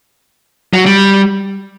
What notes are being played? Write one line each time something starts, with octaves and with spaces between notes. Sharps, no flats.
F#3
G3